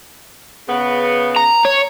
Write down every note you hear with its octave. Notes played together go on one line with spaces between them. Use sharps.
C#3 B3
A#5
C#5